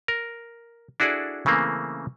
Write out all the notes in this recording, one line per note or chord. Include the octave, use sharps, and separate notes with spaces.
A#4
D4 E4 F#4 G#4 A4 D5
C#3 E3 A3 A#3 C4